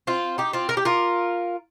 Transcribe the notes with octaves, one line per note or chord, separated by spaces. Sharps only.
C4 F4
D#4 G4
C4 F4
A#4
G4
F4 A#4